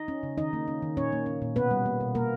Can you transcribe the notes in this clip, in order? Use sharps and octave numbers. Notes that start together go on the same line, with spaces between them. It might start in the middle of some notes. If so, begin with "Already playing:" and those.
Already playing: D#4 D#5
C#4
C#3
D#3 D#4 D#5
A#3
C#4
D#3
A#2 C#4 C#5
A#3
C#4
A#2
B2 B3 B4
G3
A#3
B2
B2 A#3 A#4